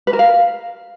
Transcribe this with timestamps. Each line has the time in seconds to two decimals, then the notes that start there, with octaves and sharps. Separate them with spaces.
0.07 B4
0.13 A#4
0.19 F5